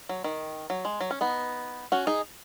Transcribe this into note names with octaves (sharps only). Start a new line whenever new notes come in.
F#3
D#3
F#3
G#3
F#3
C#4
B3 D#4
C#4 F#4
D#4 G#4